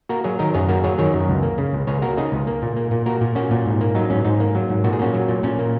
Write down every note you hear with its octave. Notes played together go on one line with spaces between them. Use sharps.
A#3 F#4 A#4
F#3 G#4 C#5
D#3 A#4 D#5
F#2 G#4 C#5
A#3 F#4 A#4
F#3 G#4 C#5
D#3 G#4 C#5
F#2
C#2
A#3
C#3
C#2
C#2 G#4 C#5
A#3 F#4 A#4
C#3 D#4 G#4
C#2
A#3
A#2
A#3
A#2
A#3 F#4 A#4
A#2
A#3 C#4 F#4
A#2
G#2
A#3
F#3 D#4
G#2 C#4
G#2 D#4
A#3
F#3
G#2
A#2 F#4
G#4
A#3 C#4 F#4
F#3
A#2
A#2 C#4
A#3